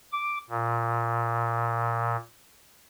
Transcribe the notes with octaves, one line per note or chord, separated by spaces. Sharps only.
D6
A#2